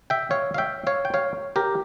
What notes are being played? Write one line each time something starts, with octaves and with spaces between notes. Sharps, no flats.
E5 G5
C#5 F5
F5
E5 G5
C#5 F5
G5
C#5 F5
G4 A#4